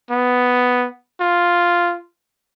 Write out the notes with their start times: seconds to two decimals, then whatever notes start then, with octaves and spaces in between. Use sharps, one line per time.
0.10 B3
1.20 F4